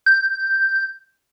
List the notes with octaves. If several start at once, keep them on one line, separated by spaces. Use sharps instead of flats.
G6